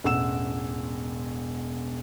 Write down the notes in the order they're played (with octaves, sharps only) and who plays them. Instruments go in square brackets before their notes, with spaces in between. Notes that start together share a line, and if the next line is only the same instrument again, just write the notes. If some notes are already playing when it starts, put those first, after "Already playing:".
[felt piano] E1 A1 F#5 E6 E7